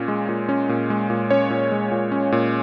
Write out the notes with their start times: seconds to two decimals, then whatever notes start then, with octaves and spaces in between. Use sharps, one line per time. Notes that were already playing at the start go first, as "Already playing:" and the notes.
Already playing: A#2 C#4
0.08 G#3
0.29 A#2
0.49 C#4
0.69 A#2
0.90 G#3
1.10 A#2
1.30 C#4 C#5
1.50 A#2
1.72 G#3
1.91 A#2
2.12 C#4
2.32 A#2